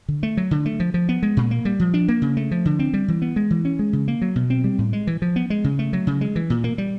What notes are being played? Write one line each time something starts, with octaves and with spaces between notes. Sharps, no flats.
D3
A3
F#3
D3
A3
F3
F3
B3
G#3
A#2
A#3
G3
F3
D4
A#3
C#3
A3
F3
D3
C4
G3
E3
B3
G#3
E3
C#4
G#3
C#3
A#3
F#3
B2
C4
G3
A2
G#3
E3
F3
B3
G#3
C#3
A3
F#3
C#3
G#3
E3
A#2
A#3
G3